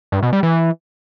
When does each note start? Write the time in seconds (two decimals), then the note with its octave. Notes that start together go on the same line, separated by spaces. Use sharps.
0.12 G2
0.22 B2
0.33 G3
0.43 E3